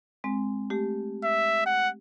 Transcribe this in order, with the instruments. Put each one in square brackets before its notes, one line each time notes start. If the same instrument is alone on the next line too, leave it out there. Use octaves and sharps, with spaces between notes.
[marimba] G#3 C4
A3 G4
[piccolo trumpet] E5
F#5